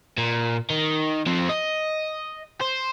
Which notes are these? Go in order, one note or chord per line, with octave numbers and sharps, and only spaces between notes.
A#2
D#3
F3 C4
D#5
C5